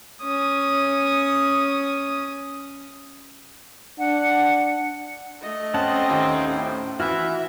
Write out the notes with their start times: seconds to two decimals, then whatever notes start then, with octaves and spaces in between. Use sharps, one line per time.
0.23 C#4 D#6
3.99 D4 F#5
5.41 A3 D#5
5.74 C4 C#4 F#5 A5
6.10 D#2
6.49 A2
7.00 E3 E4 F#4 E5 F6